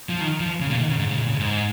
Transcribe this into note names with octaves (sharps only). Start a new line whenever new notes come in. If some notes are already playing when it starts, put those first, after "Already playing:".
F3
D#3
F3
C#3
A#2
D#3
C#3
G#2
C#3
A#2
C#3
G#2